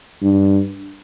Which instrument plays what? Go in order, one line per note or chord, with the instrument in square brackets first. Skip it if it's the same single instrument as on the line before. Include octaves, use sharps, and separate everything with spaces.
[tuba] G2